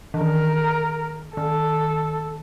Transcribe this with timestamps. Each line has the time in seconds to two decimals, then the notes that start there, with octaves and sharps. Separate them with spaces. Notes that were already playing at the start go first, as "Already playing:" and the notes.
0.14 E3
0.21 D#3 A#4
1.36 D#3 A4